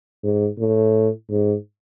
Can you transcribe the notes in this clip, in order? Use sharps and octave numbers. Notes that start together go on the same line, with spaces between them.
G#2
A2
G#2